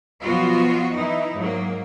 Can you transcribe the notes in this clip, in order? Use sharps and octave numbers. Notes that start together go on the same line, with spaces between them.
B2 F3 F#3 B3 F4 F#4
E3 D#4 E4
G#2 F#3 A#3